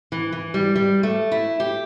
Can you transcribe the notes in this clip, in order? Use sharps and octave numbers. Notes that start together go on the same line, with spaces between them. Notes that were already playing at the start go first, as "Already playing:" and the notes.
E3
E3
G3
G3
A3
E4
G4